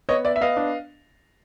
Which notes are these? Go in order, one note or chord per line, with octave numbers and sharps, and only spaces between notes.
B3 C#5 D#5
B3 D5 E5
E5
B3 D#5 F5
D4